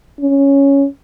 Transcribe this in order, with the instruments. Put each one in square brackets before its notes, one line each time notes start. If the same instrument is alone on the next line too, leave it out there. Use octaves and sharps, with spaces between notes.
[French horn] C#4